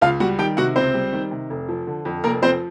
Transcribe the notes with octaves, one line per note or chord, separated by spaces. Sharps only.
C#2 F4 F5
G3 F#4 F#5
D#3 G4 G5
C3 F#4 F#5
C#2 C4 C5
G3
D#3
C3
F1
F3
D3
F2
F1 A#3 A#4
F3 C4 C5